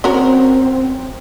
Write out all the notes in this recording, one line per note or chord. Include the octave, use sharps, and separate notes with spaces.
C4 C#4 F#4 A#4